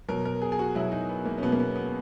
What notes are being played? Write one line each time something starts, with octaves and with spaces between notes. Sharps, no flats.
B2 F#3 A#4
A#4
G#4
G#4
F#4
B2 F#3 E4
D#4
B3
A#3
C#4
B2 F#3 B3
A#3
B3
B3